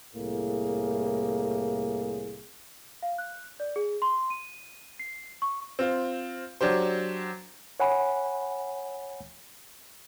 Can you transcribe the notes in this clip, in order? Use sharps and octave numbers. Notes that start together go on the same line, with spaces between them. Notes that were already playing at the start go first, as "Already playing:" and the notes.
C2 A2 A#3 G#4
F5
F#6
D5
G#4
C6
D#7
C7
C#6
C4 F4
F#3 D4 G4 C5
C#5 F#5 G#5 B5